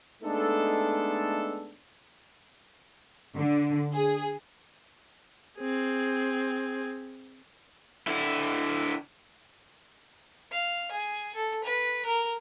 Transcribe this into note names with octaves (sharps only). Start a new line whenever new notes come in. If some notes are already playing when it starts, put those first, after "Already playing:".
G#3 A3 B3 D4 D#4 A4
D3
G#4
C4 G#4
D3 E4
F5
G#4
A4
B4
A#4